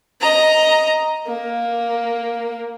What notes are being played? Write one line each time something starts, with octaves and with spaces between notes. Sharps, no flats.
D#5 A#5
A#3